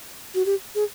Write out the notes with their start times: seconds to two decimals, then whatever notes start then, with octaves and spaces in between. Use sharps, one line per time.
0.35 F#4
0.46 G4
0.75 G#4